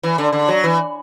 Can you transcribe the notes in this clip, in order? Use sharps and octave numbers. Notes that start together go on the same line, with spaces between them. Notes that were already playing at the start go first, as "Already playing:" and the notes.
E3
D3
D3
F#3
E3